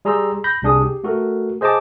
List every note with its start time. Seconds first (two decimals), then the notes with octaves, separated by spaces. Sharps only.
0.05 G3 G#4 A#5 C6 E6
0.44 B5 G6 A#6
0.62 C2 C3 D4 G#4 D#6
0.82 G4
1.04 A3 F#4 A4 A#4
1.61 G#4 C5 D#5 G#5 A5 D6